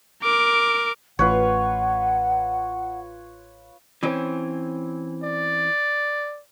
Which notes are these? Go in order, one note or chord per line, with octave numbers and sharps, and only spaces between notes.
A#4 D6
A1 F4 B4 C#5 F#5
E3 C4 C#4
D5